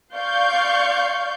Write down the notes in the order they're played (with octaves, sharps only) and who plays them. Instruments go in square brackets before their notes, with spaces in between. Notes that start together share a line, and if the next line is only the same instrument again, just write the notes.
[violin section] D5 F5 C6 C#6 G6